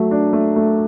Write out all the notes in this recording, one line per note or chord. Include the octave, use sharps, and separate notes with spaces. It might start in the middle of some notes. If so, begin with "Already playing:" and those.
Already playing: F#3 A3
D4
A3
A3